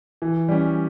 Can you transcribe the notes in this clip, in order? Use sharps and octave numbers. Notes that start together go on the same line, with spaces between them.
E3
G3 C#4